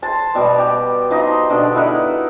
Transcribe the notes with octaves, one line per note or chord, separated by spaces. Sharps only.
C5 A5
B2 G3
G4
F3 D#4 D#5
B2 D3
D#4 E4 A#4 F#5